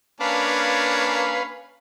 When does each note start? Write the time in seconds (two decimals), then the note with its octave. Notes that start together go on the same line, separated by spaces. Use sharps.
0.21 A#3 C#4 D4 B4 F5